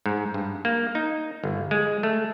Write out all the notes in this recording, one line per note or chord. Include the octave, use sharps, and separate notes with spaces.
G#2
G2
A#3
D#4
G1
G#3
A3